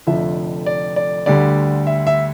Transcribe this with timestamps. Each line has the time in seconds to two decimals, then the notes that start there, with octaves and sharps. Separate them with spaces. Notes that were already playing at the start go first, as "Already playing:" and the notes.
0.07 F1 F2 D3 F3 E5
0.66 D5
0.96 D5
1.26 D2 D3 G3 D5
1.87 E5
2.07 E5